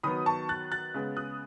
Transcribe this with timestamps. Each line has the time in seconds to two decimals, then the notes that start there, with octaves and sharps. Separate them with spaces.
0.03 D#3 F#3 B3 B5 D#6
0.26 A5 C#6
0.49 F#6 A6
0.72 F#6 A6
0.94 C#3 G#3 B3
1.17 D#6 F#6